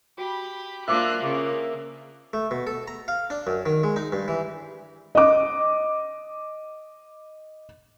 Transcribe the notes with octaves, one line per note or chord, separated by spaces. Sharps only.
F#4 G4 B5
A#3 D4 F4 A#4 C5 E5 D6 F#6
C#3 A#3 G#4
A3
B2
A4
A#5
F5
D4
F#2
D#3
G#3
D#4
G2
E3
D#5 D6